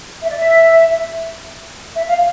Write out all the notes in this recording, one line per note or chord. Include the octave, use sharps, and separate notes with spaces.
E5
D5
E5
E5
F5